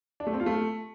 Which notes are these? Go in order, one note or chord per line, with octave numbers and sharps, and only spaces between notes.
D4
A3
C4
F4
A3